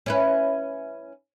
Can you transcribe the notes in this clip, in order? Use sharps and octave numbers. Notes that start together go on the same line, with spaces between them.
C#4 E4 B4